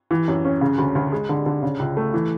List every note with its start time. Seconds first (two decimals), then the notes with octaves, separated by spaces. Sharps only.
0.11 E3
0.28 F#2
0.45 C#4
0.61 C#3
0.78 D2
0.95 D2
1.12 G#3
1.29 D3
1.46 D3
1.63 C#3
1.79 C#2
1.97 A3
2.14 E3